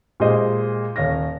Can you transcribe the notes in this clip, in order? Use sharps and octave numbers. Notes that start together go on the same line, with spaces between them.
A#2 G#3 G4 C5 D#5
D#1 C#5 F5 A#6